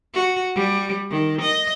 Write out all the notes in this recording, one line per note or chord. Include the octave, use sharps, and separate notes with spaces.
F#4
G3
D#3
D#5